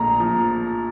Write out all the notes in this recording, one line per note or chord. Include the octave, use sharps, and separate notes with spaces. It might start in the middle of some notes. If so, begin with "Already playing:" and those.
Already playing: A#1 A#2 A3 A#5
F3